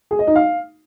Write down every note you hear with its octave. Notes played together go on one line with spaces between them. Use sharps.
G#4
D#5
D#4
F5